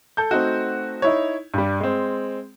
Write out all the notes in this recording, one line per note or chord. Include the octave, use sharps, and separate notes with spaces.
A4 G6
A3 C4 D#4 F#4
D#4 E4 C#5
G2 G3
G#3 C4